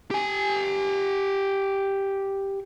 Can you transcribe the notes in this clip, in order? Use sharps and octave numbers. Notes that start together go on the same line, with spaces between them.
G4 G#5